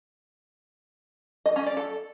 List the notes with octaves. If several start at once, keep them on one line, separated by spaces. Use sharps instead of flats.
D#5
C#4
D5
A4